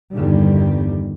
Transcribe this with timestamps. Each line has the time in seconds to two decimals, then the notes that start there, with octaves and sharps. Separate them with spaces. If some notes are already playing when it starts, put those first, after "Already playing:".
0.13 G1 E2 D3 D#3 G3